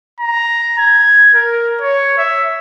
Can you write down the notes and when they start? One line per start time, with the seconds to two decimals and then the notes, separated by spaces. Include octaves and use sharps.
0.20 A#5
0.78 G#6
1.34 A#4
1.81 C#5
2.18 E5